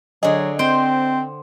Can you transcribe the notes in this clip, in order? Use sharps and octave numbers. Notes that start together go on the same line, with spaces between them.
D3 F#3 G#4 D#5
C4 C5 G5